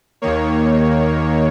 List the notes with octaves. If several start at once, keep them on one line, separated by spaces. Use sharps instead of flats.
D#2 D#3 A#3 C#5